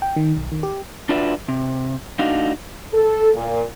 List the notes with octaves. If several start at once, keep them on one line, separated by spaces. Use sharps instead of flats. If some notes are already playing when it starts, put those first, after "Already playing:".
G5
D#3
B1
D#3
G4
D4 F4 F#4 B4 D5 E5
C3
A3 D4 D#4 F#4 F5
A4
A#2